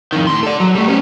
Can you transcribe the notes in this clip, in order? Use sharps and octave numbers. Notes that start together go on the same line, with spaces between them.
F2 D#3
A2 C6
A4 D5
F#3
G3 A3
B3 C#4